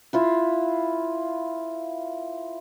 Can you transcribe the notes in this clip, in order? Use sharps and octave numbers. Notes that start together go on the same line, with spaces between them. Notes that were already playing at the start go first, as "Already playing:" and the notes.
E4 F4 B4